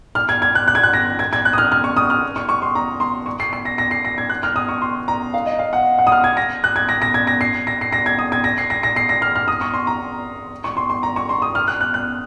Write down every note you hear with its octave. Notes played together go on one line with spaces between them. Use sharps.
F6
G#6
G#6
F#6
F#6
G#6
F#6
A#6
G#6
G#6
F#6
D#6
F6
F6
C#6
D#6
F6
C#6
C#6
C6
A#5
C6
C#6
C7
C7
A#6
A#6
C7
A#6
G#6
F#6
F6
D#6
C#6
C6
A#5
F5
D#5
F5
F#5
F#5
D#6
F6
G#6
A#6
F#6
G#6
A#6
A#6
G#6
A#6
C7
A#6
C7
A#6
G#6
D#6
G#6
A#6
C7
A#6
A#6
C7
A#6
F6
F6
D#6
C#6
C6
A#5
C#6
C6
C6
A#5
C#6
C6
D#6
F6
F#6
F#6
F#6